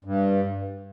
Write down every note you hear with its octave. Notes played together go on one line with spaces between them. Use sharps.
G2